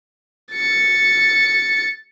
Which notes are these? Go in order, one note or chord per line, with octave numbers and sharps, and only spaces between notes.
A6 C#7